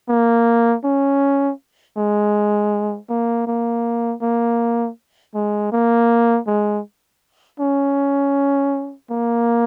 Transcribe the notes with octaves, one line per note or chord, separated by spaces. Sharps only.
A#3
C#4
G#3
A#3
A#3
A#3
G#3
A#3
G#3
C#4
A#3